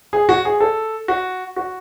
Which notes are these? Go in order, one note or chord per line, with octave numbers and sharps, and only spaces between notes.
G#4
F#4
G#4
A4
F#4
F#4